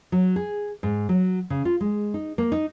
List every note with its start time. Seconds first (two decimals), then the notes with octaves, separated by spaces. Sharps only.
0.12 F#3
0.36 G#4
0.83 G#2
1.09 F#3
1.50 C#3
1.65 F4
1.81 G#3
2.14 D#4
2.38 A#3
2.52 D#4